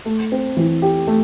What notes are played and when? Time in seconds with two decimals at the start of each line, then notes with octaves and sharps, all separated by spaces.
0.06 A3
0.32 C4
0.57 E3
0.82 G4
1.07 A3